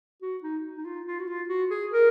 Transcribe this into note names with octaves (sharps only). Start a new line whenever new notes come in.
F#4
D#4
D#4
F4
F4
F#4
F4
F#4
G#4
A#4